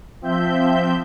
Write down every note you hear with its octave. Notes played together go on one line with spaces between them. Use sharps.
F3 C4 E5 G6